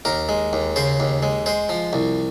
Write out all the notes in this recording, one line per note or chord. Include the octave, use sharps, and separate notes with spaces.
D#2 A#4
G#3
D#2
C#3 C5
D#2
G#3
G#3 C5
F3
C2